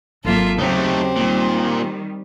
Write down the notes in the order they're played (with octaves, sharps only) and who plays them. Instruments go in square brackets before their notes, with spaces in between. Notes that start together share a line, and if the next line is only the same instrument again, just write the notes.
[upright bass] G#1 F#3 [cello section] A#3 F4 [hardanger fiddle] A4 E5
[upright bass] D#2 [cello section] C#3 F#3 G4 [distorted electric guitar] A3 D#4 [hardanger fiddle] C4
[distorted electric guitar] A#2 [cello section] D#3 G3